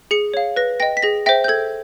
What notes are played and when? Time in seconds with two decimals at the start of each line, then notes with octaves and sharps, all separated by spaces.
0.11 G#4 C#7
0.34 C#5 F5
0.56 B4 A#6
0.80 D#5 G5 A#6
0.97 B6
1.02 G#4 A#6
1.26 C5 E5 G5 A#6
1.44 G6
1.48 A4 G#6